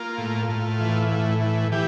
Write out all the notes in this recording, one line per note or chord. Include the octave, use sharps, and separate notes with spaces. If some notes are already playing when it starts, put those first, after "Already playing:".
Already playing: A#3 F4
A2
A2
E3
A2
E3
E3 G4